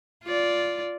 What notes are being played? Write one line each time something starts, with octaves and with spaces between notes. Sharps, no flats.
F4 D5